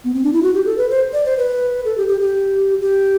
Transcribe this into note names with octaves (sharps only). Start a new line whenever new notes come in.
B3
C4
D4
E4
F#4
G4
A4
B4
C5
D5
C5
B4
A4
G4
G4
G4
G4